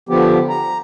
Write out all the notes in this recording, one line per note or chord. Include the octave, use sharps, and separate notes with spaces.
D3 F3 B3 G4
A#5